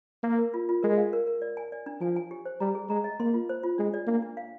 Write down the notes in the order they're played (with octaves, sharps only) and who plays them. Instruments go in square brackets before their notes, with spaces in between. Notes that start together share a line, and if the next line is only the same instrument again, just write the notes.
[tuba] A#3 [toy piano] A#4
[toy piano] A#4
F4
F4
[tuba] G#3 [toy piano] A#4
[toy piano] F5
A#4
A#4
D5
G#5
D5
D4
[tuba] F3 [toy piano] G#5
[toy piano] G#5
G4
C5
[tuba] G3 [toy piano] A#5
[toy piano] G#4
[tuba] G#3 [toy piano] A#5
[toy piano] D#5
[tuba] A#3 [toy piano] C6
[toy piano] F4
C5
F4
[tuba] G#3 [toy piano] D4
[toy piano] D5
[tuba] A#3 [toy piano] D4
[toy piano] D4
F5